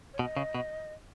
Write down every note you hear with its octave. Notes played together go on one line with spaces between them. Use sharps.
C#5
B2 D#5
C#3
B2